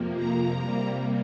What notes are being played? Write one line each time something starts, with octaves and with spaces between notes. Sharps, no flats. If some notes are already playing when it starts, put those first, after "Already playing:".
Already playing: F2 C3 F3 A#3
A#5
C3 G3 A#3